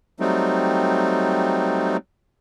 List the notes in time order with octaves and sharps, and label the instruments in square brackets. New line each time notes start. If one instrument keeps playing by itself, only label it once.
[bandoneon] F#3 G3 A3 C4 D#4